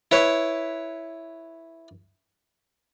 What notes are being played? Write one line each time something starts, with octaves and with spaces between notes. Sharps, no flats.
E4 B4 C#5